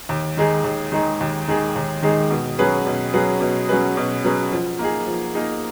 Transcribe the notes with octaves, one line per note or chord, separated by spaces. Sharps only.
D#2
D#3 G#3 D#4 G#4
D#2
D#3 G#3 D#4 G#4
D#2
D#3 G#3 D#4 G#4
D#2
D#3 G#3 D#4 G#4
B2
F#3 C#4 G#4 B4
B2
F#3 C#4 G#4 B4
B2
F#3 C#4 G#4 B4
B2
F#3 C#4 G#4 B4
F3
A#3 D#4 G#4
F3
A#3 D#4 G#4